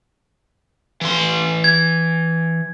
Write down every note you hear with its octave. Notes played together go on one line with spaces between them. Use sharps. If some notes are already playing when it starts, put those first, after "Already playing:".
E3 C6
G#6